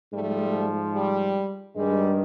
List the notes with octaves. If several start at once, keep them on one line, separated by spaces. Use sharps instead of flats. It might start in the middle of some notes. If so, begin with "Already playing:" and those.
G#2 F3 G3 A3
G3
G2 D#3 G3 G#3